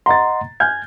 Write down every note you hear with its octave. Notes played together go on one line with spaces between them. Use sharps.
D#5 F#5 A#5 C6 A6
G#5 F6 G6 G#6